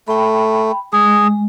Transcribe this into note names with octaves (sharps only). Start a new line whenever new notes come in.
A3 G5 B5
G#3 G#4